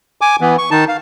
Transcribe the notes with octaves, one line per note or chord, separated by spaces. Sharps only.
G#5 D6
E3 B3
C#6
D#3 D#4 A5
F5